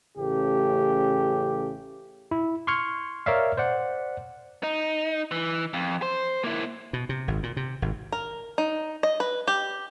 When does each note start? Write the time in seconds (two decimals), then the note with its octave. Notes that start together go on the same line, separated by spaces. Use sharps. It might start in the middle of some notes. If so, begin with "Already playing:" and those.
0.18 A1 C#3 A3 G4
2.31 E4
2.67 C6 C#6 F6 G#6 C#7
3.26 A#4 C#5 D5 E5 F5
3.57 C5 D5 F#5
4.64 D#4
5.31 E3
5.74 F2
6.02 C5
6.44 A#3 E4
6.93 B2
7.09 C3
7.28 G#1
7.43 A#2
7.57 C3
7.82 G#1
8.12 A#4
8.58 D#4
9.03 D#5
9.20 B4
9.48 G4